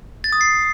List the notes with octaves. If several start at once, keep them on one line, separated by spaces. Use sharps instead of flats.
A6
D#6
C7